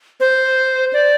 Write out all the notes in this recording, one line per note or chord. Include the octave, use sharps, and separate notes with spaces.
C5
D5